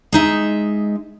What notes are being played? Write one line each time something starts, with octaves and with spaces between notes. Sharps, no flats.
G#3 D#4 E5